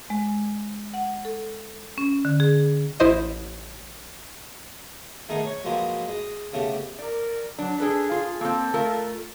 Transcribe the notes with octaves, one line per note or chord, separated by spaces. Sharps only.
G#3
F#5
A4
C#4
D3
G#4
A1 E4 C5 D#5
D#3 A3 B3 D#4 G#4
C#5
F3 F#3 G#3 A#3 B4
G#3
C#3 A3 B3 G4
A#4 D5
F#3 D4
D4 G#4 A4 B4
F4
A#3 C4 A4
A3 F4 A#4